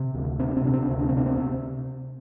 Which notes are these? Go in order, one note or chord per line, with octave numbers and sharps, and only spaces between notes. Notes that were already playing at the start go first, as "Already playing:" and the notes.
Already playing: C3
D2
C3 C4
D4
C4
C3 D4
C4
D4
D2 C4
D4
C4
C3 D4
C4
C3